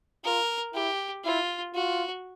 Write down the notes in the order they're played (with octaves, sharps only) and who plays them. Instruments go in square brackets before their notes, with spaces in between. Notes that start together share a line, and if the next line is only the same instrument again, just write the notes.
[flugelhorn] F4 [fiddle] A#4
[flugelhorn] E4 [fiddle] G4
[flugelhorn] E4 [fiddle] F4
[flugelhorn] F4 [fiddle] F#4